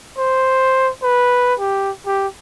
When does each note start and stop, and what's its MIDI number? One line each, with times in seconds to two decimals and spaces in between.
0.18 0.90 72
1.02 1.54 71
1.59 1.91 67
2.06 2.28 67